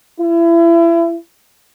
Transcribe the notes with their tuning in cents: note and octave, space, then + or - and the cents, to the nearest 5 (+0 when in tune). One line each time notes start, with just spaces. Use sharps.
E4 +30